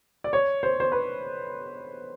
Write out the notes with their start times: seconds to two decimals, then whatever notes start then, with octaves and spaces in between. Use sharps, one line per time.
0.24 D5
0.33 C#5
0.63 C5
0.80 C5
0.92 B4